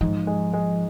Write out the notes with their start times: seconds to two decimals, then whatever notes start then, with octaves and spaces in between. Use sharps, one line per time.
0.01 G#2 F3
0.27 G#3
0.53 G#3